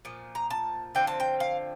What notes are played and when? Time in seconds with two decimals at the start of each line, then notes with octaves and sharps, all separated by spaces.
0.05 A#2 F3
0.35 A#5
0.50 A5
0.95 D3 F3 C4 G5
1.07 A5
1.20 G5
1.40 F5